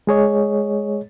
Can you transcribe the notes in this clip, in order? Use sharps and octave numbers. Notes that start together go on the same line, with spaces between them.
G#3 G#4 C#5 D#5